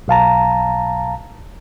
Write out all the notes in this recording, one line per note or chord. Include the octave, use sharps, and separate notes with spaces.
B1 F5 A5 A#5